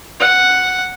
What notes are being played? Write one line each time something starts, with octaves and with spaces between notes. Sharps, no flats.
F#5